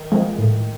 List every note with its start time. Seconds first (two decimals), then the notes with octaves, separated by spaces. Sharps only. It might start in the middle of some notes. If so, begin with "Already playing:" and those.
Already playing: D#3
0.12 F3 G#3
0.38 A2